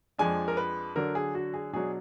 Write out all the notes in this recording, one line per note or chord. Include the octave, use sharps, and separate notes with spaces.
F2 F3 G#3 D4 G#5
A#4
B4
D3 F#3 D4 A#4
G#4
F#4
G#4
B2 F#3 D4 G#4